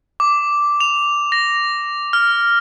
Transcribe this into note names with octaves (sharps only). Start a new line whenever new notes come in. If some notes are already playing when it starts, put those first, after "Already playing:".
D6
F7
A#6
F6